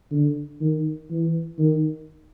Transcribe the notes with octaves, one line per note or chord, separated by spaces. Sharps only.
D3
D#3
E3
D#3